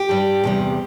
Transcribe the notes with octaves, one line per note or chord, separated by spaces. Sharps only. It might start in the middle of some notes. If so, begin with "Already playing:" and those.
Already playing: G4
G2 G3
E2 C3 G3